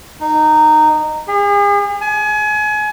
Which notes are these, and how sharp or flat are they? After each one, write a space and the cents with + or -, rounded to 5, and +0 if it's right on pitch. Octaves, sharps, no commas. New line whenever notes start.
D#4 -15
G#4 -40
G#5 +30